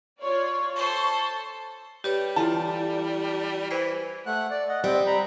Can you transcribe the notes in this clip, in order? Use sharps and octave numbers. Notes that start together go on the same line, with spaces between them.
F4 C#5 D5 C#6
A4 C5 A5
G3 G4 B4 C#5
E3 F4 A4 A5
E3 C5
A3 F#5 F#6
D5
D#5 F#5
G3 C4 G5
A#5 B5